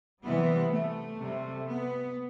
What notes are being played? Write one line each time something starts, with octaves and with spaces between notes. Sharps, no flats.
C3 E3 G3 B3
A3
C3 G3
B3